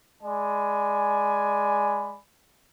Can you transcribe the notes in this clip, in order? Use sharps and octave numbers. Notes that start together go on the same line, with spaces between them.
G#3 D5 G#5 B5